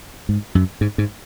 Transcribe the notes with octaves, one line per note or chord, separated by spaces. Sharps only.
G#2
F#2
G#2
G#2